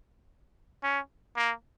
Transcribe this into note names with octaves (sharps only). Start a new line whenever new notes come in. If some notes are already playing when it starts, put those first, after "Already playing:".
C#4
A#3